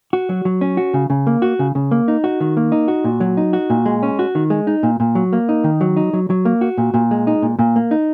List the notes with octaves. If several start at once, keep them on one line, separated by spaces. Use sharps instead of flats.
F#4
F#3
F#3
C#4
F#4
C#3
C#3
A#3
F#4
C#3
C#3
A#3
D#4
F#4
D#3
A#3
D#4
F#4
A#2
F#3
D#4
F#4
A#2
G#3
C#4
F#4
D#3
G#3
D#4
A#2
A#2
F#3
A#3
D#4
D#3
F#3
D#4
F#3
F#3
A#3
F#4
A#2
A#2
G#3
D#4
A#2
A#2
A#3
D#4